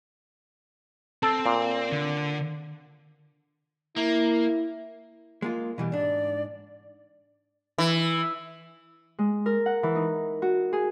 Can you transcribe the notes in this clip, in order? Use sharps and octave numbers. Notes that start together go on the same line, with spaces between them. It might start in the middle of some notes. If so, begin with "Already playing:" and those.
C4 A4
A#2
D3
A#3 E4
G#3 A#3 F4
B2 E3 G3
G#2 D4 D5
E3
G#3
A#4
F#5
E3
D#4
F#4
G#4